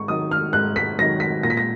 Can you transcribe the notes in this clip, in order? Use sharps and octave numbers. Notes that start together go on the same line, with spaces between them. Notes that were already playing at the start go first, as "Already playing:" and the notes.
Already playing: G#2 C#6
D#3 F#3 D#6
F6
G#2 F#6
B6
D#3 F#3 A#6
B6
A#2 A#6
B6
A#6